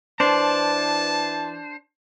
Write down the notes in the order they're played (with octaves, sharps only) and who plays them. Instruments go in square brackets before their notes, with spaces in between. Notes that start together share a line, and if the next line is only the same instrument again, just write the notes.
[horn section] E3 A5 [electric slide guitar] D4 C5